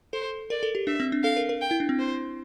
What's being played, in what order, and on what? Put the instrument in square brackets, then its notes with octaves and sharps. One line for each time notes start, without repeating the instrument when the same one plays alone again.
[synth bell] A4 [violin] C5
[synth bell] A#4 [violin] D5
[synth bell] A4
G4
[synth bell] D4 [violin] E5
[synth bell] C4
D4
[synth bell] A4 [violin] F5
[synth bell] A#4
A#4
[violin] G5
[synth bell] E4
D4
C4
[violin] C5